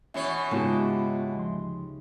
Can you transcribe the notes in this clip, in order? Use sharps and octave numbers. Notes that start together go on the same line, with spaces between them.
B2 E3 C#4 C#5 E5
G#2 C#3 G#3 B3 D#4 F4 G4 A5
D2 F3 C6